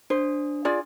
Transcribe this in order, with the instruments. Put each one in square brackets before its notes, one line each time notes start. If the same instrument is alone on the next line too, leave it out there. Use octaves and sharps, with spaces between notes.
[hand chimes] D4 [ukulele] C5
[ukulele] F4 G#4 D5